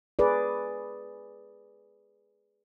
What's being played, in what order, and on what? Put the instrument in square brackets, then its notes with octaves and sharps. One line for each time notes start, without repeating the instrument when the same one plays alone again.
[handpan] G#4 B4 D5